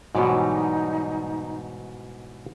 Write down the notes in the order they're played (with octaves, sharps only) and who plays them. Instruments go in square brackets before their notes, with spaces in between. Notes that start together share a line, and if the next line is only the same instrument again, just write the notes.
[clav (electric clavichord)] G#2 B2 [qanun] E3 F#3 G3 [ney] D#4